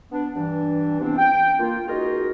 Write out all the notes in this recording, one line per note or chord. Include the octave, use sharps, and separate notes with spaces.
B3 D4
G2 E3 D4
C3 E3 B3 C4 D4
G5
A#3 F4
C#2 D#4 F4 F#4 G#4 A#4